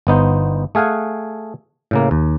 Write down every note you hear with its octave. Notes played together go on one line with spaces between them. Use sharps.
G1 B3 D#4 C5
A3 G#4 F5 F#5 G#5
A2 C#3 A#3
D#2